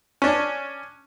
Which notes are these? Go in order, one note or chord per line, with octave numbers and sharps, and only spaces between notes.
C#4 D4